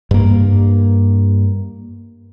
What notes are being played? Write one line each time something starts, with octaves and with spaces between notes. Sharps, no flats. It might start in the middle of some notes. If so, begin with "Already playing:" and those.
G2 A#3